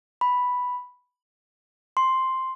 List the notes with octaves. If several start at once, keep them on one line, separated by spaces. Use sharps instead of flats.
B5
C6